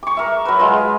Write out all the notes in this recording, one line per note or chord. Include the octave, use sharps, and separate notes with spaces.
C#6 D6
A#4 E5
F#3 B4
G#3 F4